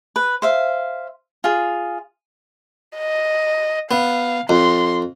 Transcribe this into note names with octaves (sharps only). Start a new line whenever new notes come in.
B4
C5 E5 F5
F4 G#4
D#5
B3 F5
F2 C6